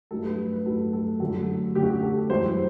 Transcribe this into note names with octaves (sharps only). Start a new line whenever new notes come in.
G2 F#3 A3 A4
B4
B4
G2 F#3 A3 A4
A4
F#2 D3 F#3 A3 A4
F#2 D3 F#3 A3 G4
F#4
G4
A4
F#2 E3 G3 C5